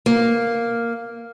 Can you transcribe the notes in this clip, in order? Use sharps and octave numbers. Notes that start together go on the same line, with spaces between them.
A#3